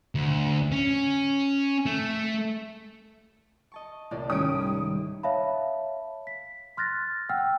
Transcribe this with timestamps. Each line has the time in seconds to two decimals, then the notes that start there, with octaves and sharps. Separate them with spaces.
0.15 D2
0.72 C#4
1.86 A3
3.72 D#5 A5 C#6
4.11 C2 A2 D5
4.30 G#2 D#3 G3 A3 C#4 D#6 D7
5.23 C#5 E5 F5 A5 B5
6.27 B6
6.77 C6 F6 F#6 A6 A#6
7.29 F#5 G5 E6 F6